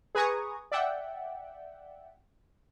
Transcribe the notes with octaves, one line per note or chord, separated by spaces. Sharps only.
G#4 B4 G#5 A#5 C#6 D#6
D5 E5 F#5 G5